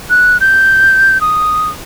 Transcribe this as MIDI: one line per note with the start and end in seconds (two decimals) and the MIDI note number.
0.10 0.37 90
0.41 1.20 91
1.21 1.69 87